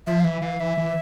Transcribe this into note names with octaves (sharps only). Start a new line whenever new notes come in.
F3 E5
F5
E3 E5
E3 F5
E3 E5
E3